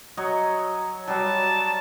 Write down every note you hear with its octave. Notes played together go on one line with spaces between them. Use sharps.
F#3 C#5 D#5
F#3 G3 A5